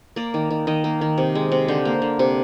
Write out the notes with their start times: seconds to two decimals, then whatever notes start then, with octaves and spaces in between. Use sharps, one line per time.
0.16 A#3 D5
0.34 D#3
0.51 D#3
0.67 D#3 D#5
0.84 A#3
1.01 D#3
1.18 C3
1.35 G#3
1.52 C3
1.68 D3 C5
1.85 A#3
2.02 D3
2.19 C3